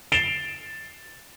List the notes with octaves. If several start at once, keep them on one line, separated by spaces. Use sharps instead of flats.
A6 C7 D7 E7 F7 G7